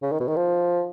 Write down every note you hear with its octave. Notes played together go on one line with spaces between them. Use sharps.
C#3
D#3
B2
D#3
F3